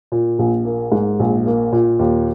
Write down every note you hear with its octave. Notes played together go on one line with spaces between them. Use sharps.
A#2
A#1
A#3
G#2
A#1
A#3
A#2
D#2